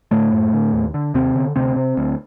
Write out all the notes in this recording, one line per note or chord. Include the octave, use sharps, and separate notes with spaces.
A2 D3 A3
F#2
D3
D#2
D3
D#2 C3 C4
D3
D2 C3 C4
C3
D2